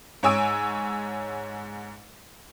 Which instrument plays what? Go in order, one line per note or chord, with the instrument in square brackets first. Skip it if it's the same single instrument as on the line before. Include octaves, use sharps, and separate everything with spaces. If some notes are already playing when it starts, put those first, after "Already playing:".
[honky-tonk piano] G#2 C#5 G#5 E6 D7